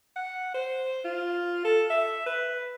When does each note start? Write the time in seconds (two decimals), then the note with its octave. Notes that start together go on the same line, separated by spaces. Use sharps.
0.16 F#5
0.54 C5
1.04 F4
1.64 A4
1.90 E5
2.26 B4